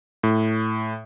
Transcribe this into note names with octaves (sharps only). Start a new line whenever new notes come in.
A2